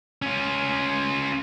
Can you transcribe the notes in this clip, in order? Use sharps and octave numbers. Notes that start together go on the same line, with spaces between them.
C#4 F4